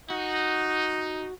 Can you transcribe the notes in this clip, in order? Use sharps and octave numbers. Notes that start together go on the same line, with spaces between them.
D#4 F#4